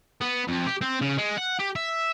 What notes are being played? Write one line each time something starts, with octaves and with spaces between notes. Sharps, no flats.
B3
F2
G4
C4
C#3
G#3
F#5
G4
E5